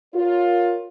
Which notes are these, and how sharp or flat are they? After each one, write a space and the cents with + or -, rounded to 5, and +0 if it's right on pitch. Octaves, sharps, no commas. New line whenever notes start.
F4 +15 A#4 +0 C#5 +0